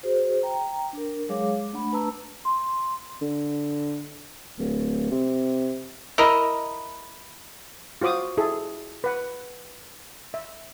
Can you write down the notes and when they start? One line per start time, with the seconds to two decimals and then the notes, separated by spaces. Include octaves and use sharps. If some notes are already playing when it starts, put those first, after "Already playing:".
0.03 F#4 G#4 C5
0.43 G5 A#5
0.93 D4 A#4
1.29 F#3 G#3 G#4 C#5 F5 D6
1.73 A3 D4 F#5 B5
1.91 A3 D4 B4 A5 A#5 E6
2.45 C6
3.21 D3
4.59 D1
5.11 C3
6.18 E4 A#4 D#5
8.01 F4 F#4 C5 D6 D#6
8.37 E4 G#4 A4
9.04 B4 F#5
10.34 E5